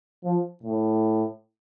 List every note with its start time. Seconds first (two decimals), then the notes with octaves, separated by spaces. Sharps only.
0.25 F3
0.64 A2